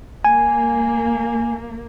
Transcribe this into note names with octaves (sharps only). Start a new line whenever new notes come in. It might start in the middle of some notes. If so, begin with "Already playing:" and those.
A#3 G#5